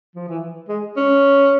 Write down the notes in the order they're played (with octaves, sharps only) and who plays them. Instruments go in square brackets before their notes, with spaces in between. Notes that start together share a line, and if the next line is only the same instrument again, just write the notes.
[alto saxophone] F3
E3
G#3
C#4